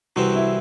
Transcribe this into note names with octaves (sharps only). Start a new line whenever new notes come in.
C2 C3 E3 C4 F#4
E4